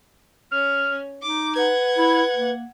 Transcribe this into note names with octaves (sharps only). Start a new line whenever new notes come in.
C#4 F6
D#4 D6
B4 F#5 G#6
E4
A#3